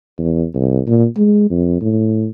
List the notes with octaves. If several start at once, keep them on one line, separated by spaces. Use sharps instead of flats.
E2
C2
A#2
G#3
F2
A2